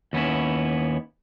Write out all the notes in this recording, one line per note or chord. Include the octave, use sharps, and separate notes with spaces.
D#2 B3 C#4 E4